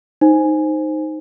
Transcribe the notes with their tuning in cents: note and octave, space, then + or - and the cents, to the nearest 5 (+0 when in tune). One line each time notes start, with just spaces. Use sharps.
D#4 +0 C5 +0 G#5 +0